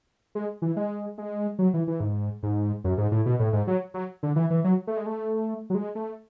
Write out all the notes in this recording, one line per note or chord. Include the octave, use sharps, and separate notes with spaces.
G#3
E3
G#3
G#3
F#3
E3
E3
G#2
G#2
F#2
G#2
A2
B2
A2
G#2
F#3
F#3
D3
E3
E3
F#3
A3
G#3
A3
F#3
G#3
A3